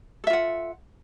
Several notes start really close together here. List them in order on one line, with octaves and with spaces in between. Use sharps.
A4 E5 F4 F#5